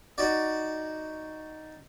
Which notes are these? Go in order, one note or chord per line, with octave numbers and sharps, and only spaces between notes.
D#4 F#4 D5